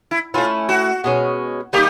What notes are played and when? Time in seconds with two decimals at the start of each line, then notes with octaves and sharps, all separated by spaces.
0.11 E4
0.34 A3 C#4 E4 F4
0.69 F#4
1.04 B2 G#3 C#4
1.73 D#3 G3 A#3 D#4 G4